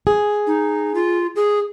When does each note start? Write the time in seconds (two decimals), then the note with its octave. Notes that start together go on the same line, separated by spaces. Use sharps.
0.07 G#4
0.47 D#4
0.95 F4
1.36 G#4